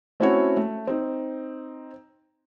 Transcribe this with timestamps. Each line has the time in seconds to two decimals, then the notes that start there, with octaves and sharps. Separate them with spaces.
0.20 A3 C4 C#4 E4 F#4 C#5
0.57 A3
0.87 C4 D#4